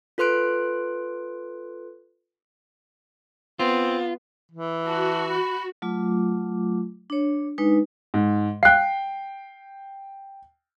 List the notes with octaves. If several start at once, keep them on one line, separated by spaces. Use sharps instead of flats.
F4 A4 B4 C6 F#6 D7
B3 C4 F4
E3
F#4 A5
B5
F#3 A3 F4 D6
D4 C#5
G#3 D4 D#4 B4
G#2
F5 G5 F#6 C7